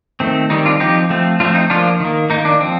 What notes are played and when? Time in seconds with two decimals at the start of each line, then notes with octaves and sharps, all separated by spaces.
0.20 D#3 A3 C4
0.50 D#3 G3 C4 D#4
0.66 D4 F4
0.80 F3 C4 D#4 G4
1.10 F3 A3 C4
1.40 F3 A3 C4 D4 F4
1.55 D#4
1.70 F3 A#3 D4 F4
2.00 D#3 A#3
2.30 D#3 A#3 D#4
2.45 D4
2.60 F3 C4